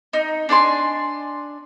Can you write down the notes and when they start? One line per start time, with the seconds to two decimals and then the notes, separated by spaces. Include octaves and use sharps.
0.13 D#4
0.49 D4 D5 G#5 C6